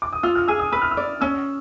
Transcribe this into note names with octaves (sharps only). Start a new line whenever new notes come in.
D6
D#6
F4 E6
F6
G#4 E6
D#6
B4 E6
F6
E6
D5
C#4 E6